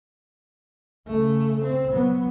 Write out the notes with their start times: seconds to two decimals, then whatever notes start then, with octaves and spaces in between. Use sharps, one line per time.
1.08 C#3 A3
1.62 C4
1.92 F#3 B3